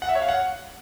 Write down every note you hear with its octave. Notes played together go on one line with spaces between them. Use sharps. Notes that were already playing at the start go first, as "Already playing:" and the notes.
F#5
E5
C#5
F5
F#5